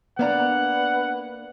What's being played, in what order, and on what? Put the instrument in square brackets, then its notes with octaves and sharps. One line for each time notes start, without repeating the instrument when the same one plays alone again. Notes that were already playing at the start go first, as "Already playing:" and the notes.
[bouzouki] A#3 D5 A#5 [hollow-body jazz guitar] B3 D4 [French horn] B4 [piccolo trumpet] F#5